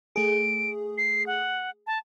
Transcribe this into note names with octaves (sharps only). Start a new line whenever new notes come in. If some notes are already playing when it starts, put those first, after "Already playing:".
A3 G#4 D7
C7
F#5
A5